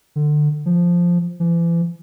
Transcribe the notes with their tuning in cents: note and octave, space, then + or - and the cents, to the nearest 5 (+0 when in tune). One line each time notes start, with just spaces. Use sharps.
D3 +25
F3 +0
E3 +40